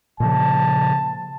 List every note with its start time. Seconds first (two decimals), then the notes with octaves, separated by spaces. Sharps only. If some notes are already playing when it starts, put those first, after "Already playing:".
0.20 A#2 C#3 F3 A5